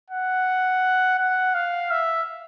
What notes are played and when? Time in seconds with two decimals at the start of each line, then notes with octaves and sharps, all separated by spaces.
0.10 F#5
1.19 F#5
1.55 F5
1.91 E5